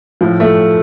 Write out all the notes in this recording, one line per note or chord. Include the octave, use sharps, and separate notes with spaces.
A2 F3
A3